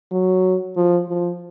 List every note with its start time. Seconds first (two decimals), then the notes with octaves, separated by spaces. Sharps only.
0.11 F#3
0.76 F3
1.08 F3